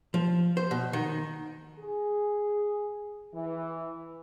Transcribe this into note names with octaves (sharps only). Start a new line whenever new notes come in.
F3
C5
B2
D#3
G#4
E3